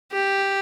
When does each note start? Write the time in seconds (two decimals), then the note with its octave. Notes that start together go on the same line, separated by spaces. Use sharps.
0.12 G4